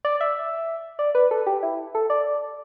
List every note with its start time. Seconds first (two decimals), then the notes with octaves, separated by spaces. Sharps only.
0.05 D5
0.21 E5
0.99 D5
1.15 B4
1.31 A4
1.47 G4
1.63 E4
1.95 A4
2.10 D5